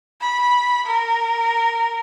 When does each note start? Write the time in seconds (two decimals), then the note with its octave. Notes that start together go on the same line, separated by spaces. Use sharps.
0.22 B5
0.86 A#4